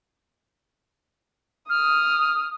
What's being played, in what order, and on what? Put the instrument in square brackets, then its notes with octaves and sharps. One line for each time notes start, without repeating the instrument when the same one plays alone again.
[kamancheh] D#6 [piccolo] F6